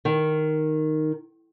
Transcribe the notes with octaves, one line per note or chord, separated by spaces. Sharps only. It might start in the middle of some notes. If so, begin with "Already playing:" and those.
D#3